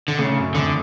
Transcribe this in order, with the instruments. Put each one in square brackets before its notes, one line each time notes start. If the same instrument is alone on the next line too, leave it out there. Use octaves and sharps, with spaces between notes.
[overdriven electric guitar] D3
[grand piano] A2 [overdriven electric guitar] C#3
[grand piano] F#2
[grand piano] F2 [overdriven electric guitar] D3